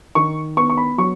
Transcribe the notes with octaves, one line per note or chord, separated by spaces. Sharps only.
D#3 C#6
B3 C#6
C#6
B5
F#3 C#6